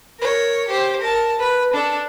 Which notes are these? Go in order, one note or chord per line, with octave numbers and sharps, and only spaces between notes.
A#4 C#5
G4 C5
A#4 A5
B4
D4 A4